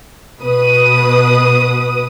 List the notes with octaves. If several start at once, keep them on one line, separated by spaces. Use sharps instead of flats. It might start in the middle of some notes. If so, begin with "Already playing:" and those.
B2 B4 D#6